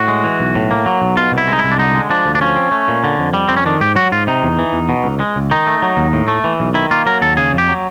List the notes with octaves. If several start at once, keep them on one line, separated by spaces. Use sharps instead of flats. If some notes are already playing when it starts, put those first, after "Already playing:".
Already playing: A2 F#4
G#3
E3
B1
A2
A#3
F#3
B1
B2 F4
C2
E4
G#3 D#4
E4
C2
D4
D3 D#4
G#3
F3 D4
D2
D4
F3 C#4
C4
A3
A#2
D3
F2
G3
F2 C4
C#4
D#3 D4
G#2 G4
F#3 F#4
G#2 F4
C3 D#4
E2
E3
E2
B2
C#2
G#3
C#2
D#3 D#4
A3
F#3
D#2
A2
A3
E3
B1
D#3 E4
A#3 F4
F#3 A#4
D#2 A4
C#3 G#4
F2
G4
F#3